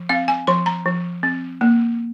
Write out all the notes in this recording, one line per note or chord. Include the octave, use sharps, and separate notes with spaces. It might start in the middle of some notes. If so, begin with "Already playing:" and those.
Already playing: F3
C4 F5
G#5
F3 C6
A#5
F3
C4
A#3